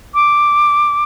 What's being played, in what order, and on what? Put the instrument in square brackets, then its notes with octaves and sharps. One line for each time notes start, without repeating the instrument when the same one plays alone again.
[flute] D6